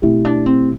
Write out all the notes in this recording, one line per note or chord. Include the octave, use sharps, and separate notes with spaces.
B2 A3 C4 E4 G4
D4
C4